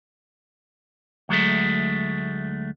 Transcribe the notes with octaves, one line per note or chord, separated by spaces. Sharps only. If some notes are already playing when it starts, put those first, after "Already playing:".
D2 F#3 G#3 A3